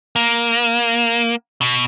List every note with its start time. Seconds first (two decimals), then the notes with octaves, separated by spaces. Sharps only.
0.16 A#3
1.61 B2